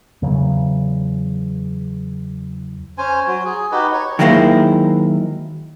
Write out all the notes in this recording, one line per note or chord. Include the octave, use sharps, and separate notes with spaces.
E2 C#3 F#3
C#4 C5 G#5
F#3
G#4
D#4 F#4 G4 B4
C#5
D#3 F#3 G#3 A#3 E4 C5